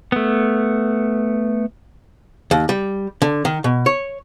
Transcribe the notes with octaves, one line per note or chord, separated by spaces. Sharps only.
A3 B3
D#2
G3
D3
D#3
B2
C#5